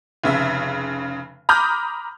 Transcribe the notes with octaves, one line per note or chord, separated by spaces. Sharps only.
F1 C#3 E5
A#5 B5 D6 D#6 F6 G6